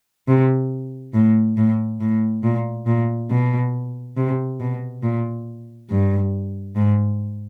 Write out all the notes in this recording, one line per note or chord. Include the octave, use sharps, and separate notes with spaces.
C3
A2
A2
A2
A#2
A#2
B2
C3
B2
A#2
G2
G#2